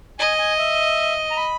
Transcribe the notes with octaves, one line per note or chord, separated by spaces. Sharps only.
D#5 G#5
G#5
E5
A#5
B5